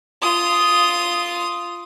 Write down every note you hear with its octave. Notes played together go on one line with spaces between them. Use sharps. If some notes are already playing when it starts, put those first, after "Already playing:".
F4 D#6